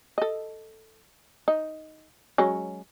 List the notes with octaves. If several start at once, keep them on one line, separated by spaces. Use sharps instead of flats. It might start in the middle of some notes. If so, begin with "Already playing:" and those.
A4 D#5
D#4
F#3 G#3 C#4